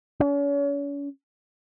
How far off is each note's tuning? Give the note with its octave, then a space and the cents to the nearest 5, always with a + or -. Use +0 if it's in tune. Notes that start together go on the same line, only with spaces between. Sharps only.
C#4 +40